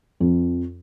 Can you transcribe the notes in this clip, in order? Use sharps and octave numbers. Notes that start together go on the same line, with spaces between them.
F2